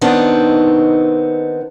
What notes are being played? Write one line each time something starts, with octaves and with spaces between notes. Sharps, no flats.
D#3 B3 C4 D4 D#4